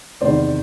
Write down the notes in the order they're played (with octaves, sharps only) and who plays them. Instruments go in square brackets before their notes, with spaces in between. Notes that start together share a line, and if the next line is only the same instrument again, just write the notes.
[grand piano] E2 C3 D#3 C5 D5